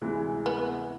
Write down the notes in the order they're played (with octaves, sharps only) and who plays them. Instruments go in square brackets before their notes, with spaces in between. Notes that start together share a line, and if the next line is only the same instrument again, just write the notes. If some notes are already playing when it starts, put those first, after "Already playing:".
[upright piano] D2 C3 E3 G#3
[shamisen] B3